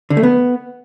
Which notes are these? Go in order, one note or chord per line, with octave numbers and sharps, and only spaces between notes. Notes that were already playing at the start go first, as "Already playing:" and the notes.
D3
A3
B3